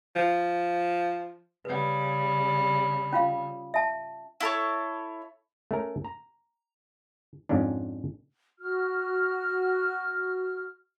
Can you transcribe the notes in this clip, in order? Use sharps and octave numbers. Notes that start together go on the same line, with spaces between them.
F3
C#3 G3 B4
C#4 F4 F5
E5 A5
E4 A4 C#5
A3 C#4 A#4
A#5
F2 G#2 C#4 D4
F#4 F6